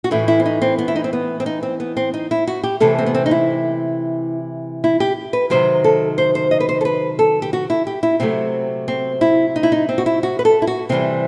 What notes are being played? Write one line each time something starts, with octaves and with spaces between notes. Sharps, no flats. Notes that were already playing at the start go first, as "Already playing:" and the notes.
F#4
A2 E3 A3 E4
E4
C4
D#4
C4
B3
E4
D#4
C4
B3
C4
D#4
C4
B3
C4
D#4
E4
F#4
G4
C3 E3 A3 A4
C4
B3
C4
D#4
E4
E4
G4
B4
C3 D#3 F#3 C5
A4
C5
C5
D#5
B4
C5
A4
B4
A4
G4
F#4
E4
G4
E4
C3 F#3 A3 C4
C4
E4
D#4
E4
D#4
C4
F#4
E4
F#4
B4
A4
E4
F#4
C3 E3 G3 C4